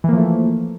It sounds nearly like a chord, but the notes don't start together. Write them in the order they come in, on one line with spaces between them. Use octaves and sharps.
E3 A#3 F3 A3